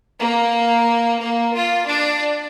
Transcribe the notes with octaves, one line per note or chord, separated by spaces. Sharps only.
A#3
A#3
F4
D4